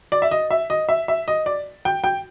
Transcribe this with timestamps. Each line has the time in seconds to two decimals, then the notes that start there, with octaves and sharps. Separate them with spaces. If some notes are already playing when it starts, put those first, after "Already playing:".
0.12 D5
0.22 E5
0.31 D#5
0.51 E5
0.70 D#5
0.89 E5
1.08 E5
1.28 D#5
1.46 D5
1.85 G5
2.04 G5